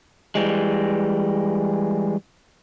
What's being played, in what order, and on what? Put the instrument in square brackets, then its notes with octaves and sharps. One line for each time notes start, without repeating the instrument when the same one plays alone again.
[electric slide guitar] E3 G3 G#3